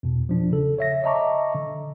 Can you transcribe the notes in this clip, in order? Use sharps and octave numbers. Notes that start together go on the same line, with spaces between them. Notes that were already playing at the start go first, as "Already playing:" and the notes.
E2 B2
F3 D4
C#3 A4
C#5 E5 A#6
D#5 E5 A5 A#5 C#6 D6
D3